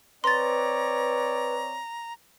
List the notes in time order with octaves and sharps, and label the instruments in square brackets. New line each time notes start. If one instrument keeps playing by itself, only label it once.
[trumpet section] C4 C#5 D5 [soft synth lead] B4 [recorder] A#5 [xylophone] C6 A6